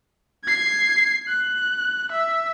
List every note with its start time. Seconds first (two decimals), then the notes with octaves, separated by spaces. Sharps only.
0.45 G#6 C7
1.28 F#6
2.12 E5